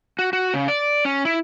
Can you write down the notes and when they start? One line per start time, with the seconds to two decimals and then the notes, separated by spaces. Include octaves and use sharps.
0.19 F#4
0.33 F#4
0.54 C#3
0.68 D5
1.05 C#4
1.25 E4